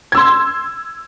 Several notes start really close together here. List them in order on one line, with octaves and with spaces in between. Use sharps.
G#6 E6 C6